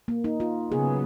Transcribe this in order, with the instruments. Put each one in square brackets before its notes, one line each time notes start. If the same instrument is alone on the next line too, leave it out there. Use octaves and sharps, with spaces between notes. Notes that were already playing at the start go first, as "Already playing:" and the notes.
[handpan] A#3
D#4
F4
[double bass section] C#3 F#3 B3 [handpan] G#4